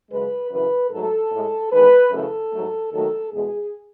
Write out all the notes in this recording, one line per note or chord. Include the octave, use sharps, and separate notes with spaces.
F#2 C#3 G#3 B4
F#2 C#3 E3 B4
G#2 F#3 A3 A4
A2 G#3
E2 D#3 G#3 B4
F#2 C#3 E3 A3 A4
G#2 F#3 A3
D#2 D#3 F#3 A3 A4
E2 B2 G#3 G#4